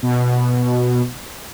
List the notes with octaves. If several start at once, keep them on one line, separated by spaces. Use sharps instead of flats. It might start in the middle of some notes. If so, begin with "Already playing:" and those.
B2